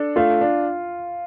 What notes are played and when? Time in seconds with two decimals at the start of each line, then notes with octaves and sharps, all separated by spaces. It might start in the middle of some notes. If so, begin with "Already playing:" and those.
Already playing: D4 A4
0.16 A3 F4
0.41 D4